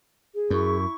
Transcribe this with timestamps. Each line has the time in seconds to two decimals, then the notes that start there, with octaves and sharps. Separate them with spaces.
0.35 G#4
0.50 F#2 E4 C#6